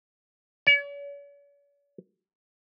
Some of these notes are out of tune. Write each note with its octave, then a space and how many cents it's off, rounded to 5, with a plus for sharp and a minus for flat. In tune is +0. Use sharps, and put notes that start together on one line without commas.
C#5 +45